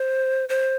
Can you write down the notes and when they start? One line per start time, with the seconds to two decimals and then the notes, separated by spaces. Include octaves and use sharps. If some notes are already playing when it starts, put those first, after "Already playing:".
Already playing: C5
0.49 C5